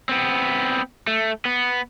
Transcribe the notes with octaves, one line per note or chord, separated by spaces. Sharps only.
B3 C4
A3
B3